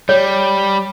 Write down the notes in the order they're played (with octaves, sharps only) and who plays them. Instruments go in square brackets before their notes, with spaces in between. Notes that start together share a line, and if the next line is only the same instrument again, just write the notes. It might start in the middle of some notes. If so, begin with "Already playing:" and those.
[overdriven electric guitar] G3 [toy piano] C#5